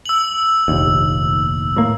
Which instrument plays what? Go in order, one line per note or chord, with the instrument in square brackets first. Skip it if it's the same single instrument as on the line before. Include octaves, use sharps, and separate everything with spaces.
[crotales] E6 F#7
[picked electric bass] F1 A#1 D#2
A2 A#3